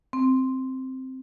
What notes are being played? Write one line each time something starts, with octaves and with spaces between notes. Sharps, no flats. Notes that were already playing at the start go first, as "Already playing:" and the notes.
C4